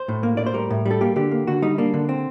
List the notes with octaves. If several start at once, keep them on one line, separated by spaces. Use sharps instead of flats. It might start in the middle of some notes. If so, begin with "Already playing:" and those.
Already playing: C5
A2
A#3
A2 D5
C5
G3 A#4
A2
G3
A4
A#3 G4
D3 G4
A#3
D3 F#4
G3 D#4
A#3 D4
D3
C4